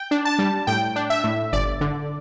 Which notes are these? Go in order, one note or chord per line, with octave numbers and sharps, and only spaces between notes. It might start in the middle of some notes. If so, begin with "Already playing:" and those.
Already playing: G5
D4
A5
G3
A2 G5
D4
E5
A2
G1 D5
D3